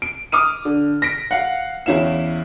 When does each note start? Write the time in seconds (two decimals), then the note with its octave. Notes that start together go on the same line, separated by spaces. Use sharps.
0.02 D7
0.32 D6 D#6 F6 D#7
0.65 D3
1.02 A#6 B6 D7
1.31 F5 F#5
1.86 E2 C#4 E4 F5 E7